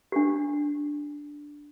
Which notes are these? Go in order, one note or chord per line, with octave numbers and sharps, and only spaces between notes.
D4 G4